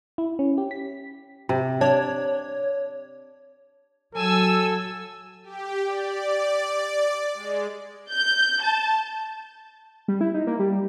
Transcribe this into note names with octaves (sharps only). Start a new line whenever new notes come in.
E4
C#4
G4
B6
C3
D4 C#5
F#3 A4 G#5 E6
G4
D5
G#3
G6
A5
G3
E4
D#4
A#3
G3